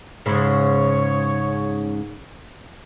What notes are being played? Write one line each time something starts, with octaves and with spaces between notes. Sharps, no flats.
G#2 C#3 C#5